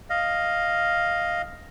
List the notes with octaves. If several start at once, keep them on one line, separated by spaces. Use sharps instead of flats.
D#5 F5